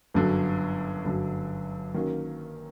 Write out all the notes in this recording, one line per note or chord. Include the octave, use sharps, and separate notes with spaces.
G1 F#2 D3 F#3
G1 F#2 D3 F#3
D#3 F#3 A#3 C#4